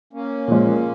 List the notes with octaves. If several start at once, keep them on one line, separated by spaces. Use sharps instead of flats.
A#3 C#4
A#2 F3 G#3